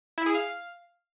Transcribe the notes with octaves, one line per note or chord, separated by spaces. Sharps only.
E4
G#4
F5